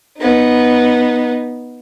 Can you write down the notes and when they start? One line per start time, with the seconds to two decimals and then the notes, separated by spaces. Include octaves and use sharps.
0.18 B3 D#4